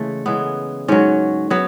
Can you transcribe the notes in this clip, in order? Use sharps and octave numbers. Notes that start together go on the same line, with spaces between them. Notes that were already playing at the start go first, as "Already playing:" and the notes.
Already playing: C#3 E3 G#3 A3
C#3 E3 G#3 B3
G#2 F#3 C#4
F#3 B3